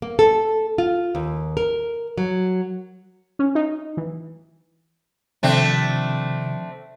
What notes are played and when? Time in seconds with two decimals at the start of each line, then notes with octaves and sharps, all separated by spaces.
0.02 A#3
0.19 A4
0.78 F4
1.15 D#2
1.57 A#4
2.18 F#3
3.39 C#4
3.55 D#4
3.97 E3
5.43 C3 D#3 F3 A3 C4 D4